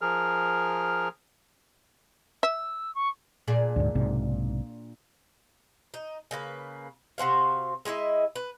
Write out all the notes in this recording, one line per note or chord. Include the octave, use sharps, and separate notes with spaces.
F3 G#4 A#4 F6
E5 E6
C#6
A#2 D4 G#4
D2 G#2
B1 G#2 C3
D#4
C#3 A#3 B4
C3 F#4 C5 F5
G#3 E4 D#5 E5
B4